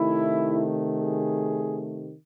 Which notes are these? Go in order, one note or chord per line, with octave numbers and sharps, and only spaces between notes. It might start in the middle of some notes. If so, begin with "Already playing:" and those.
Already playing: C3 D#3 A3 E4
G#4